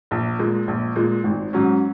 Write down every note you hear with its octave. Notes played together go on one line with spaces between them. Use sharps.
A#1
A#2 G#3
A#1
A#2 G#3
G#1
G#2 F#3 C#4